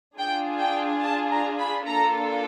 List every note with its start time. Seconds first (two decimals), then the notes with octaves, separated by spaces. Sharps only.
0.18 D4 F4 G#4 G5
0.61 G5
1.03 A5
1.31 A#5
1.59 B5
1.87 A#3 D4 F4 A4 A#5